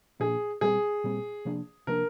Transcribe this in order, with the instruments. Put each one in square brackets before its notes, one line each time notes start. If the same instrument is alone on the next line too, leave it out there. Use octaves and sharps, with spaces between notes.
[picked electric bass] A#2 F3 A#3 D4 [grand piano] G#4
[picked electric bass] A#2 G3 C4 [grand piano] G#4
[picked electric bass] A#2 G3 C4
C3 F3 A#3 D4
[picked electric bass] C3 F3 A#3 D4 [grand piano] A#4